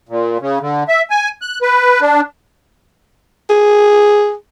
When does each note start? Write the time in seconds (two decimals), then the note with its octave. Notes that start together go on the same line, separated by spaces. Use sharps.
0.09 A#2
0.40 C#3
0.61 D3
0.88 E5
1.10 G#5
1.42 F#6
1.62 B4
2.01 D4
3.50 G#4